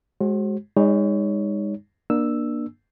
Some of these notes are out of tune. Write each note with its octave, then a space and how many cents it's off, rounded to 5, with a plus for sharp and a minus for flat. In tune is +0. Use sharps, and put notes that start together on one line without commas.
G#3 +0 F#4 +20 C5 +45
G#3 -35 D#4 +0 C#5 +20
A#3 +25 D4 +20 E6 +0